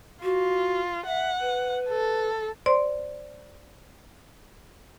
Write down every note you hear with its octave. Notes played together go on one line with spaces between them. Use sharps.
F4 F#4
E5 F#5
B4
A4
C5 D5 C6